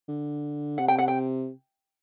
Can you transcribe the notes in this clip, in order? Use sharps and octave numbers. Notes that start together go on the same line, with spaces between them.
D3
C3 F#5
G5
F#5
G5